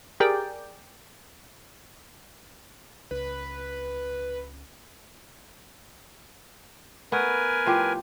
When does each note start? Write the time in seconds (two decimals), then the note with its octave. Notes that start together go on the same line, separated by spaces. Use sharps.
0.20 G4 G#4 A#4 D5 G5
3.11 C#2 B4
7.12 A3 B3 A#4 B4 G#5
7.66 A2 F3 G4